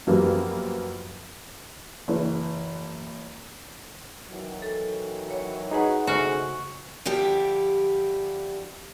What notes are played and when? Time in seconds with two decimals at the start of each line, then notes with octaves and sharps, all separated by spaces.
0.07 F#2 F3 G3 A#3 B3 F#4
2.08 F#1 E3 B4
4.31 D#3 E3 F#3
4.62 A4
5.31 C#5
5.71 D#4 F#4 G#4 B4 C#5 F#5
6.07 C#3 G#3 A3 F#4 C5 G#5
7.05 D3 F3 G3 E4 G4